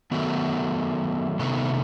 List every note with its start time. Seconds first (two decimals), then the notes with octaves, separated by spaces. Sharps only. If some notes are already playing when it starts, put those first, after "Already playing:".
0.11 D#3 F#3 A3 B3
1.39 C3 D#3 A3 B3